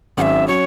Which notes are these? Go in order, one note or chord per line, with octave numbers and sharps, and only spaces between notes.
G#1 G#2 F#3 C#4 E5 F#5
F#3 C#4 C#5